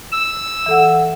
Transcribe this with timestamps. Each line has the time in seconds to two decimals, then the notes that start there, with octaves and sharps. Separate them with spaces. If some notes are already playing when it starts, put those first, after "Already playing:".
0.12 E6
0.66 E3 A4 F#5